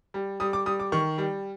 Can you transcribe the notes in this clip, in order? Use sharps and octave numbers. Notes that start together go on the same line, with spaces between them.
G3
G3 D#6
D6
G3 D#6
D6
D#3 C#6
G3